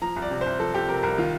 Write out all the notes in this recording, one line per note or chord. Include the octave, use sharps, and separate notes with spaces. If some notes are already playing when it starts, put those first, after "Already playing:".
F3 A#5
C2
D5
C3
C2 C5
F3 A4
C2 G4
C3 A#4
C2 A#4
D#3 F4